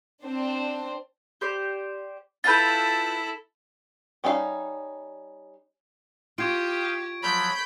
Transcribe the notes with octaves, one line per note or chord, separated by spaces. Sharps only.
C4 D4 C5
G4 C5 D5
E4 F4 A4 B4 G6 A6
G3 C#4 D#4 G#4 F5
F4 G4 F5 G5 C#6 D#6 G#6 D7
F3 F#3 B5 G6